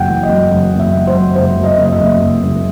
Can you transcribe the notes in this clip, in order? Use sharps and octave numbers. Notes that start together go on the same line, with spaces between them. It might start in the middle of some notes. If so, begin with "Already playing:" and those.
Already playing: F#1 F#2 F#5 G5
E3
D#5
F#2
F#1
F#1
E5
F#1
C5
F#2
F#1 C5
F#2
D#5
F#1
D#5
E5
F#1
F#1
F#1